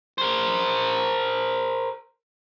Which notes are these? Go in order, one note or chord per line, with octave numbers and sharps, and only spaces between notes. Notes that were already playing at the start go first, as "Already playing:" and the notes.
A#4 C5